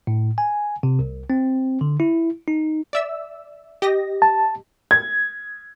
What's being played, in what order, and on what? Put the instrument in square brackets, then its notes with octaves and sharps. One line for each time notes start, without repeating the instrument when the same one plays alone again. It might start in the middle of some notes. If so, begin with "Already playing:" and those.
[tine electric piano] A2
G#5
C3
C2
C4
D3
E4
D#4
[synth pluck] D5 E5 E6
G4 D#5 A#6
[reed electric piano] A5
[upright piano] G#6